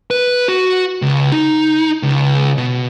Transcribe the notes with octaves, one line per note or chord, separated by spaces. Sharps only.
B4
F#4
C#2
D#4
C#2
B2